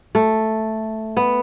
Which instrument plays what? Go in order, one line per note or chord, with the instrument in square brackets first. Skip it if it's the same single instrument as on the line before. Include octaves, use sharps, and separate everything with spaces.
[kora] A3
B3